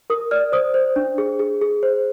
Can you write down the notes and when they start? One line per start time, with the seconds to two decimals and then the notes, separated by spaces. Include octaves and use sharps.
0.10 A#4 D#6
0.31 D5 F6
0.52 C5 D#6
0.74 C5
0.96 D4
1.18 G#4
1.39 G#4
1.61 G#4
1.83 C5